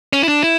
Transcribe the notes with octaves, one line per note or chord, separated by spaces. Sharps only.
C#4
E4
D4
E4